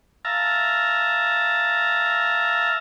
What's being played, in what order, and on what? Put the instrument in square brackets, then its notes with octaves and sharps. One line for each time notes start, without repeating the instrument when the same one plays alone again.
[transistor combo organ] E5 F5 A5 A#5